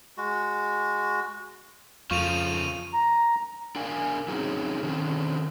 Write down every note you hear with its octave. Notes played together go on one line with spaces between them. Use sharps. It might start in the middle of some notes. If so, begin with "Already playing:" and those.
G#3 F#4
F2 C#3 F3 F4 C#6 D#7 F7
A#5
D4 A#4 F5 G#5
F#3 C4 C#4 D#4 G#4
D3 D#3 C4 C#4